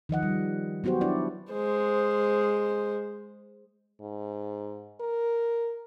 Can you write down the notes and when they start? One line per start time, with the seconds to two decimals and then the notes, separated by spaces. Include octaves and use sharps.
0.09 D#3 F3 D#5 F#5
0.23 G3
0.84 F#3 B3 F#4 G4 C5
1.01 D4 E4 D5
1.52 G#3 C5
4.01 G#2
5.00 A#4